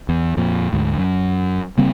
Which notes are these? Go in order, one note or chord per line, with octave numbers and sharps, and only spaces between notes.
E2
F2 A#2
D2 G#2
F#2
C#3 G3 A#3 C4